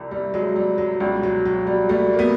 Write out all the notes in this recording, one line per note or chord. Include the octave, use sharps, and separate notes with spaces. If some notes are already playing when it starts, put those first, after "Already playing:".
Already playing: C2 C3 F3 G3
G3
F#3 G#3
G3
F#3
C#2 B2 G3
F#3
F#3
G3
G3 A3
A#3
A3 B3